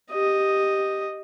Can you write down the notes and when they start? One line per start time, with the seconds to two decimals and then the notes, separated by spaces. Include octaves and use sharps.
0.12 G4 D#5